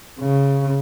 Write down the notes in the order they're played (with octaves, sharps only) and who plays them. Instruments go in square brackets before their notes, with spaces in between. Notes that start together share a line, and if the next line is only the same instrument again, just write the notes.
[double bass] C#3